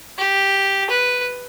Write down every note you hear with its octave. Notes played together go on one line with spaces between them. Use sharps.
G4
B4